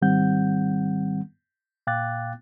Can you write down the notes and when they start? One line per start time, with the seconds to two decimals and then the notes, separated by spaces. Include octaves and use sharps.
0.02 G#2 D#3 G3 C4 F#5 G6
1.87 A#2 F5 G5 D6 F#6 A6